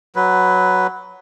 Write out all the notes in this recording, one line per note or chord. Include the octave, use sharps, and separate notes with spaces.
F#3 B4